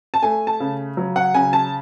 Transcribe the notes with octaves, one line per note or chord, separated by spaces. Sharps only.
A5
A3 G#5
A5
C#3
F#3
F#5
C#3 G#5
A5